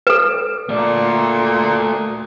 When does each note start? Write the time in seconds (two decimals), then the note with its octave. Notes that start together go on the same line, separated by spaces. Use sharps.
0.07 A4 B4
0.69 A#2 A3 D5